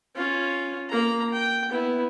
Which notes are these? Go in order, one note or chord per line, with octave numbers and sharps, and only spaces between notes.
C#4 F4
A#3 A#5
G5
B3 E4